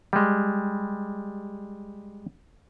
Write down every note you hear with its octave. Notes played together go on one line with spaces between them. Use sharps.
G3 G#3